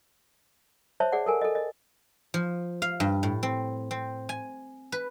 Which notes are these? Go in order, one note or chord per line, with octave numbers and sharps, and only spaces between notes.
C5 C#5 E5 A5
G#4 D5 F#5
A4 A#4 G#5
A4 D#5
D#5
F3
F5
G2
A2
C4
C4
G#5
B4